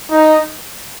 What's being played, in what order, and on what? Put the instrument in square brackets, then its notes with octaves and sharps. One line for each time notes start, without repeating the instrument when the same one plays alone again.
[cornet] D#4